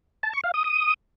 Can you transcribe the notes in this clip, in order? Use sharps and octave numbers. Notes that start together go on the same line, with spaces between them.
A5
C#6
F5
D#6
D#6